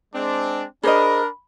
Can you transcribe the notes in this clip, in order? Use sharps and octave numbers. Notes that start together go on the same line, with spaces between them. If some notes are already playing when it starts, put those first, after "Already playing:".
G#3 C4 D4
D4 G#4 A#4 C5 D#5 B5